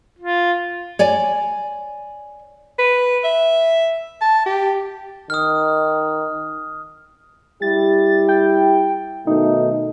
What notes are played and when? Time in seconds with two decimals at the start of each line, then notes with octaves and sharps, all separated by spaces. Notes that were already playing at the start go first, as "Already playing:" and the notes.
0.19 F4
0.99 C#5 D5 G#5
2.79 B4
3.24 E5
4.21 A5
4.46 G4
5.30 D#3 D#6 F6
7.62 G3 E4 G4 A6
8.29 G5
9.27 B2 D#3 A3 D#4